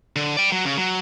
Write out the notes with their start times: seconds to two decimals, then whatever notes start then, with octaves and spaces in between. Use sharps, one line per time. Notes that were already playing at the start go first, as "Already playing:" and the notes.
0.16 D3
0.37 D5 G5
0.52 F#3
0.65 C#3
0.77 F#3